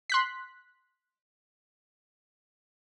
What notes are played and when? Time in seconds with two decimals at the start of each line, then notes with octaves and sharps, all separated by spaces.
0.10 C6 F#6 B6